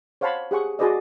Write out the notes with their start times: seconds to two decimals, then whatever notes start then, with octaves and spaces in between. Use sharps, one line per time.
0.21 C5 C#5 F5 F#5 A5 B5
0.51 G4 G#4 F#5 C#6
0.79 F#4 G#4 B4 D5 D#5